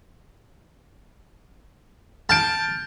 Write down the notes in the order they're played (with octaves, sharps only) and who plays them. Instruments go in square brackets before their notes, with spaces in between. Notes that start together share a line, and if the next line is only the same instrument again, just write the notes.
[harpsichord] A5 [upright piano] F6 G6 D7